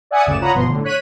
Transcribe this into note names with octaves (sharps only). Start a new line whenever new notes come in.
D5 E5 F#5 G#5 D#6 C#7
G1 D2 C#3 D5 E7
F4 C#5 F#5 A#5 B5 D#6
G1 B2 F3 C6
A2 D3
C#5 F#6 B6 D#7